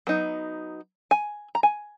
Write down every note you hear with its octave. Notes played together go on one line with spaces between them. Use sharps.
F#3 B3 D#4
G#5
A#5
G#5